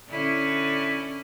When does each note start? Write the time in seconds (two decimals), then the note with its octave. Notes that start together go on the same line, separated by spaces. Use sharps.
0.10 D3 C#4 E4